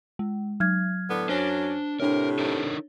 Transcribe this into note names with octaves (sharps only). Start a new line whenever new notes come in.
G#3
F#3 F6 G#6
A2 D3 B3
F#2 F#3 C#4 D4 C5 G7
A2 C3 D4 A#4 C#5
D#4 A4 A#4